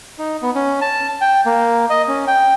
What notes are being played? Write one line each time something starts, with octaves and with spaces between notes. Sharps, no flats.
D#4
B3
C#4
A5
G5
A#3
D#5
C#4
G5